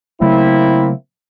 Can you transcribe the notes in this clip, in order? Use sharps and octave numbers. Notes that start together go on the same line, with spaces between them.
C#3 F#3 A3 A#3 C4 E4